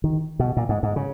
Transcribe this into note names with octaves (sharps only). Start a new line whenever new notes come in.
D#3
B2
A#2
G#2
G#2
C#3